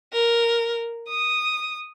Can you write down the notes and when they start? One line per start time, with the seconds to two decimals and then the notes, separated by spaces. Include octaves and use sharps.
0.13 A#4
1.09 D#6